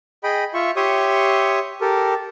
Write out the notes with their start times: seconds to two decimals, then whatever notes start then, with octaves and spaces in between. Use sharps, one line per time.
0.24 G#4 D#5 G5 B5
0.54 F4 E5 C#6
0.76 G4 C#5 E5 C6 C#6 D#6
1.81 G4 A4 A#4